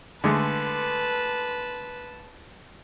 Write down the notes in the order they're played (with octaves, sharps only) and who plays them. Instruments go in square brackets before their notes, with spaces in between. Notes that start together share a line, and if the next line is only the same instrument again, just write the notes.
[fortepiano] D3 G#3 A3 [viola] B4 A5